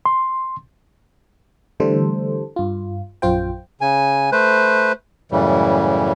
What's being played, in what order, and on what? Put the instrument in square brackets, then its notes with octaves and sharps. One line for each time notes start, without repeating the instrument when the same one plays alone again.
[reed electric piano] C6
[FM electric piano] D3 E3 G3 A3 A4 C5
G2 F4
A#1 F#2 F4 C5 G5
[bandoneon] C#3 G#5
A3 B4 C5
F#2 A2 C#3 E3 G3